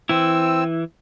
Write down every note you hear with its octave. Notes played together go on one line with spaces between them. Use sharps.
E3 C4 E4 E6